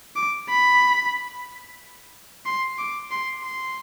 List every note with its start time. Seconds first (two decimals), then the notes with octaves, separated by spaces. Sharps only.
0.16 D6
0.49 B5
2.46 C6
2.78 D6
3.11 C6
3.44 C6